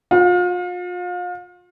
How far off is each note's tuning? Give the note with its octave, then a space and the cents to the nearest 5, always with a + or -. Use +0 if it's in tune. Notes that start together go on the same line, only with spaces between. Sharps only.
F4 +35